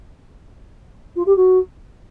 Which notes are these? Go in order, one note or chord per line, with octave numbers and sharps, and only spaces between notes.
F4
G4
F#4